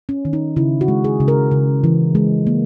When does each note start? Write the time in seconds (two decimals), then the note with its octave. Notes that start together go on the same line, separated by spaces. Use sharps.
0.09 C#4
0.25 D#3
0.33 D#4
0.56 C#3 E4
0.81 F#4
0.88 G#3
1.04 G#4
1.20 C#3
1.28 A#4
1.51 C#3
1.84 E3
2.15 G#3
2.47 A#3